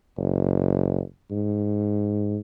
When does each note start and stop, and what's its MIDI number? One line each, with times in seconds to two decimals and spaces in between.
0.17 1.00 30
1.31 2.38 44